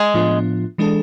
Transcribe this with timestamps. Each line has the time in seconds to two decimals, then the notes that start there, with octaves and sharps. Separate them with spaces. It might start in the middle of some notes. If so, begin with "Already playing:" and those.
Already playing: G#3
0.14 A2 F3 B3 D4 F4
0.78 E3 G#3 D4 A4